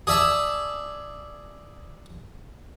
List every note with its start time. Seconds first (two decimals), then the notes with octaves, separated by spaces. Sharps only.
0.07 G#4 D5 E5 A5